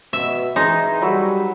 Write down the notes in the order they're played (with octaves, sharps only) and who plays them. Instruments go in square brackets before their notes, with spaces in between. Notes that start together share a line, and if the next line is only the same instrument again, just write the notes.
[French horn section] B2 [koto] E5
[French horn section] E3 [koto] D#4 [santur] G#4 C6
[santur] F#3 B4 E6 [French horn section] G3